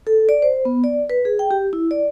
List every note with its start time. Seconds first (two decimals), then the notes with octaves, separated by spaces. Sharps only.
0.07 A4
0.29 D5
0.42 C5
0.65 B3
0.84 D5
1.10 B4
1.25 G#4
1.39 G5
1.51 G4
1.73 E4
1.91 D5